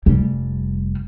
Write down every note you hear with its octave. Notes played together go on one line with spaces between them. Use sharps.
F1 G3